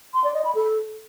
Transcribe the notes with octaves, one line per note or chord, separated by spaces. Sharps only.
C6
D5
D#5
B5
A4